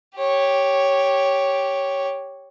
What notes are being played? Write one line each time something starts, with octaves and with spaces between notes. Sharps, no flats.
G4 C#5